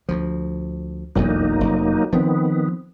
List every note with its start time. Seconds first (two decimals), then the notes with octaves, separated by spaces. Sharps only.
0.09 D2 F3
1.16 E1 B1 F2 F#3 A#3 D#4
1.60 F1 F2
2.13 D#3 F3 B3 C4